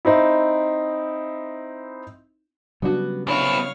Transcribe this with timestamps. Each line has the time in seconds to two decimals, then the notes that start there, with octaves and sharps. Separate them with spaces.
0.05 C4 D#4 E4
2.82 C#3 F#3 G3 B3 D4 F#4
3.28 B3 C4 D4 E4 C#5 F5